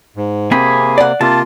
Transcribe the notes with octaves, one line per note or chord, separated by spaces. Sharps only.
G#2
C3 A#3 C4 G#4 G#5 B5
D5 F#5
C3 A#3 F4 A5